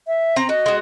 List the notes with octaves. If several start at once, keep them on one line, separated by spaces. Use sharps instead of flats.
E5
C4 A#5
F#4 D#5
G#3 F#4